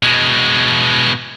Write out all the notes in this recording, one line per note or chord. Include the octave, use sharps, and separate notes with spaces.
B2 G#3